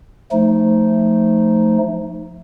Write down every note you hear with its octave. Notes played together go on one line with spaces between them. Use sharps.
F3 A3 D#4